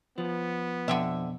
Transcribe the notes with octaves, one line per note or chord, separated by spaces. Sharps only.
F3 B3
F2 B2 D3 C4 E5